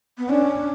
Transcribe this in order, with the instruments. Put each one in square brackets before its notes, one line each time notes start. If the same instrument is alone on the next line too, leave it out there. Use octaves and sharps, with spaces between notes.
[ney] B3
[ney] C#4 [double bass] D4